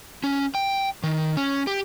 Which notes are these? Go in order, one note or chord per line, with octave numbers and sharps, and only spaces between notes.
C#4
G5
D#3
C#4
G4